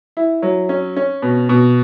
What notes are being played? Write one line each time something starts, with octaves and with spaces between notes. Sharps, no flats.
E4
F#3
C#4
C#4
B2
B2